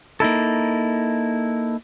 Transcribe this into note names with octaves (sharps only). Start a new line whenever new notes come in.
A#3 D#4 E4 A4